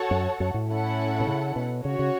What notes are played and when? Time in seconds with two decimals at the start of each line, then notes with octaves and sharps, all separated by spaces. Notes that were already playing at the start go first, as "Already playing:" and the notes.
Already playing: F#4 A4 C#5 F#5 A5
0.11 F#2
0.40 F#2
0.54 A2
0.69 C#4 E4 A4 F#5
1.20 B2
1.27 C#3
1.56 B2
1.84 C#3 C#4 F#4 C#5
1.99 C#3